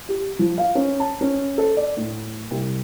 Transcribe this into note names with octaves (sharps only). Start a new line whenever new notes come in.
G4
F3
F5
C#4
A5
C#4
A4
D5
A2
C2